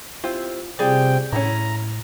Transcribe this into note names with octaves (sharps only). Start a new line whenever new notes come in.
C4 E4 F4 G4
C3 G3 C4 F4 G#4 D5 G5
A2 C#4 E4 A#5